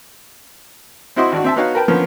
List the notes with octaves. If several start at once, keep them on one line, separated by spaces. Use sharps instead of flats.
C4 E4 F#4 C5 D#5
G#1 D4 F#4
C4 E5 A5
B3 D#4 F#4 C#5 F5 F#5
A#4 B4 G5 A5
D3 F3 A#3 B3 C#4